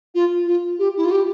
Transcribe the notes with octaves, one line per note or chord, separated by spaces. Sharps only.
F4
F4
G4
E4
F4
G4